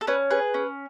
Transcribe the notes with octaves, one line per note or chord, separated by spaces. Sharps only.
A4
C#4 B4
G#4 B4
C#4